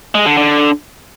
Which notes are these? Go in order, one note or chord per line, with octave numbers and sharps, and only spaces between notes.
G#3
D3
D3